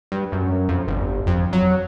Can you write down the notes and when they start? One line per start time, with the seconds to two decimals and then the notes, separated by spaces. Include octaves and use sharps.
0.12 G2
0.32 F#2
0.69 F2
0.88 G1
1.27 F2
1.53 F#3